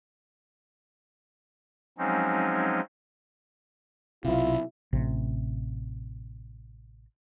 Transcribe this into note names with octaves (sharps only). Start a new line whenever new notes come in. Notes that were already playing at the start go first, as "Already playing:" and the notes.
F3 F#3 G#3 C4 C#4 D#4
B1 C3 E4 F4
A1 C3